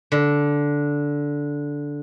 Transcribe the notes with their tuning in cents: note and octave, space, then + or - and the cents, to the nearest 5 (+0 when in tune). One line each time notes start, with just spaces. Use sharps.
D3 -10